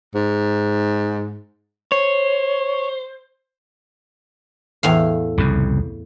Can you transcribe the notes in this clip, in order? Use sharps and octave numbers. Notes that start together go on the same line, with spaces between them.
G#2
C5 C#5
E2 A2 F5
C2 F2 C#3